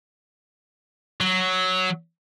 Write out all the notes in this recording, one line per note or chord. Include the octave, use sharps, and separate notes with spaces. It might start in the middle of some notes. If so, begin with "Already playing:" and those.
F#3